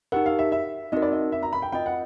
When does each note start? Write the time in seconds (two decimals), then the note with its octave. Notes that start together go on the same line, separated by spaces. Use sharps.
0.12 D#4 G4 A#4 F#5
0.26 F5
0.39 E5
0.52 E5
0.92 C4 D#4 F#4 A#4 D#5
1.02 D5
1.12 D#5
1.32 E5
1.42 A#5
1.53 B5
1.62 G5
1.72 C4 F4 A#4 D#5 G5
1.86 F#5